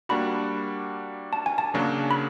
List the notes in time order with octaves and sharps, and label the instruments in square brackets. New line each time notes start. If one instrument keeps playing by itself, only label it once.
[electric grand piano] G3 A#3 D4 F#4 [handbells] B5
[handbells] A5
G#5
A5
[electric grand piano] C#3 F#3 A#3 D4 F#4
[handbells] B5